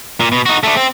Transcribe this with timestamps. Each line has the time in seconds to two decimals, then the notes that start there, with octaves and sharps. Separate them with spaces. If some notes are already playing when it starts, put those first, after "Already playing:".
0.20 A#2
0.32 B2
0.46 D#4 F#4
0.63 A3 D4
0.77 C4